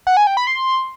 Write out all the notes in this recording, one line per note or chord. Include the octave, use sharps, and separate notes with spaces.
F#5
G#5
G5
B5
C6